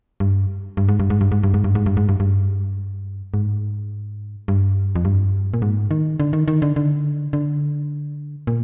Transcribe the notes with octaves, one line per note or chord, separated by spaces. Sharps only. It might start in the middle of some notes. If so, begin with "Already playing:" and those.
G2
G2
G#2
G2
G#2
G2
G#2
G2
G#2
G2
G#2
G2
G#2
G2
G2
G#2
G2
F2
G2
A#2
G#2
D#3
D3
D#3
D#3
D3
D3
D3
A#2